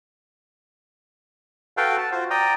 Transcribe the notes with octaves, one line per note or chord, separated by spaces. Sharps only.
F#4 A4 B4 F5 G5
A5
F4 F#4 C5
D5 G5 A#5 D#6